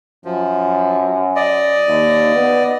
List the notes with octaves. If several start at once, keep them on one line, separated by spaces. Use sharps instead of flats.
F#2 F3
D5 D#5
D#2
B3